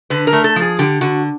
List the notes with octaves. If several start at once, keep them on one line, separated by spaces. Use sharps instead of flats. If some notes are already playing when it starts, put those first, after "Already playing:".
D3 B4
A#4
A3
A4
F3
G#4
D3 G4
D3 F#4